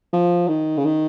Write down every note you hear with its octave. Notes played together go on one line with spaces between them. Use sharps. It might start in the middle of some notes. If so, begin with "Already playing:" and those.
F3
D#3
C#3
D#3